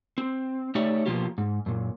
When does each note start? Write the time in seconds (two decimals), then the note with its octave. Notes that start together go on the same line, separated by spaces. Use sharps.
0.18 C4
0.75 A3 D#4 G4 C#5 D5 E5
1.06 B2 E3 F3 A#3 F4 G4
1.38 G#2
1.66 F#2 A#2